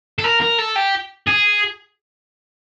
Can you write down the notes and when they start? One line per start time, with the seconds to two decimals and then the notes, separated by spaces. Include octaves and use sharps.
0.19 A4
0.24 A#4
0.41 A#4
0.58 A4
0.76 G4
1.28 G#4